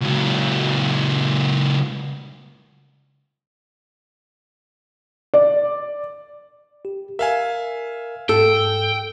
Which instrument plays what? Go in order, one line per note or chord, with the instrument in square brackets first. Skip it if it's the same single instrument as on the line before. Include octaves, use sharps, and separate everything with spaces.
[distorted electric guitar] C#2 F#3
[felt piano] D5
[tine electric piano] G4
[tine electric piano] A#4 [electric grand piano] E5 F5 G#5
[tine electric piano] G#2 E6 [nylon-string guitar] A4 [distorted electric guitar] G5